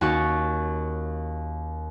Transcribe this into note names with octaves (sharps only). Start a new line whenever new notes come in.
D#2 C#4 F#4 C#6 A6